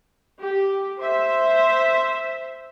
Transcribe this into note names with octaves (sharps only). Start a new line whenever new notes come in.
G4
C5 E5